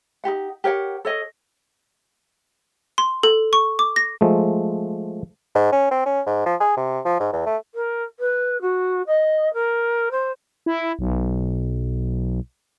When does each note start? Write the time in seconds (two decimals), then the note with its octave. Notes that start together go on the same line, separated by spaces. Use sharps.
0.24 D#4 F#4 G4 F#5
0.64 G4 A#4 C#5 F#5
1.05 A4 C#5 D#5
2.98 C6
3.23 A4
3.53 C#6
3.79 D6
3.96 A#6
4.21 F3 G#3 A3
5.55 G#2
5.72 C#4
5.91 C4
6.06 C#4
6.26 G#2
6.46 F3
6.60 G#4
6.77 C3
7.05 F3
7.20 G#2
7.33 E2
7.46 A3
7.75 A#4
8.19 B4
8.61 F#4
9.07 D#5
9.53 A#4
10.11 C5
10.66 E4
10.99 B1